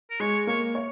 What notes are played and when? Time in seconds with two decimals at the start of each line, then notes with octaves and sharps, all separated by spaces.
0.11 A#4
0.20 G#3 C#5
0.47 A#3 C#5
0.75 C#5